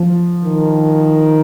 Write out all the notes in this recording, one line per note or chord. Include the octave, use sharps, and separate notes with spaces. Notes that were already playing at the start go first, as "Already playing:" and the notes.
Already playing: F3
D#3